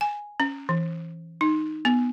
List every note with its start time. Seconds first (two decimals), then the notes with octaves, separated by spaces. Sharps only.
0.01 G#5
0.40 C#4
0.69 E3
1.41 D#4
1.85 B3